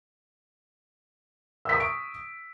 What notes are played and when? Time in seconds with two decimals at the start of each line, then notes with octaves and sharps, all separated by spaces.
1.65 E6
1.69 B6
1.73 D#6
1.76 C#6
1.80 D7